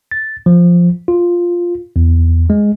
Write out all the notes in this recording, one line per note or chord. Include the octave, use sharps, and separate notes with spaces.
A6
F3
F4
E2
G#3